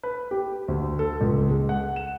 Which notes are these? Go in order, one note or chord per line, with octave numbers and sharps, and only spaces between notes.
B4
G4
D2
A4
C#2
G#3
F#5
E7